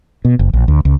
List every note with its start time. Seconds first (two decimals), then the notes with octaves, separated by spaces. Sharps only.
0.25 B2
0.39 F#1
0.53 A#1
0.68 D2
0.85 C#2